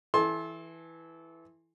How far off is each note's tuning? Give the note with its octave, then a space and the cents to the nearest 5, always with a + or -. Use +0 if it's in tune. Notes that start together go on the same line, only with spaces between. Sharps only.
E3 +0 A4 -25 C6 +25